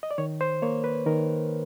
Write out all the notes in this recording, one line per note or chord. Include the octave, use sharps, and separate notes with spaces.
D#5
D5
D#3 C#5
C5
A#3 C#5
B4
D#3 A#4